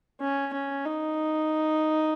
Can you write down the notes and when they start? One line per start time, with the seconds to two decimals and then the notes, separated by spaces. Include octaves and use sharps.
0.21 C#4
0.53 C#4
0.85 D#4